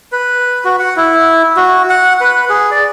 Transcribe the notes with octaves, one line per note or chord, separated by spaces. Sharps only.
B4
F#4
F#5
E4
F#4
F#5
B4
G#4
D5